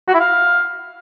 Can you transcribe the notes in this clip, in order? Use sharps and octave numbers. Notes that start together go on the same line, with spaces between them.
F#4
E4
F5